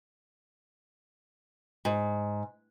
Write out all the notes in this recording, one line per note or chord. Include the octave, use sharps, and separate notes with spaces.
G#2